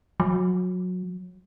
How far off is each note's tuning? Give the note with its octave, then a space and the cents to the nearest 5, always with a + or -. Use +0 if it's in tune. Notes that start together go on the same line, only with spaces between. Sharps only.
F#3 -25